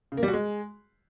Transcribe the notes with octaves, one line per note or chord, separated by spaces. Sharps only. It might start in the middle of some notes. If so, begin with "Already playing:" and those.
C#3
A#3
G3
F#4
G#3